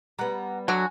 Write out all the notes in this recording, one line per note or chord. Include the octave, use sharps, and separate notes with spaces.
G3 B3 F#5 A#5
D3 F#3 F#4 G#5